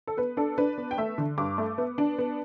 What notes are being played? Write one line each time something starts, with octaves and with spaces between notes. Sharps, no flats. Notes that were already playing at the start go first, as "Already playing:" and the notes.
A4
B3 B4
D4 A4
D4 B4
B3
G5
A3 E5
D3
G2 D6
A3
B3
D4
B3